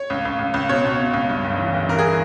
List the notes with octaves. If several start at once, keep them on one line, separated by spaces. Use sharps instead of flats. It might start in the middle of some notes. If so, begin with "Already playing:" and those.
Already playing: C#5
C#2
C#2
C#2
C#2
B2 C#5
B2
B2
C#2
G2
G1
E3
G1
E3 A#4
G#4